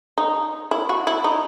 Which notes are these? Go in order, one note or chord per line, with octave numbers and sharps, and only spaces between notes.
D#4
E4
F#4
E4
D#4